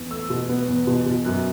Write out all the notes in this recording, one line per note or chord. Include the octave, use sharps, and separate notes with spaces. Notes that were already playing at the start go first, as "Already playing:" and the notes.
Already playing: E2
A3 E6
B2
B3
E2
B2
B2
F#2 F#6